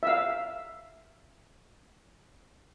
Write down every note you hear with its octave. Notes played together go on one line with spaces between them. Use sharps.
E5 F5